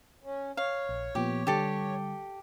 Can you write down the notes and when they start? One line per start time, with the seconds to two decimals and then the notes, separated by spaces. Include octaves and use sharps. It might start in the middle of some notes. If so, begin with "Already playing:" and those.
0.23 C#4
0.57 C#5 F5
0.89 A#1
1.15 A#2 F3 B3 G4
1.47 D3 G3 G4 A4